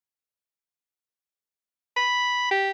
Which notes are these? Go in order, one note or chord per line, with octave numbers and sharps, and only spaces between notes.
B5
G4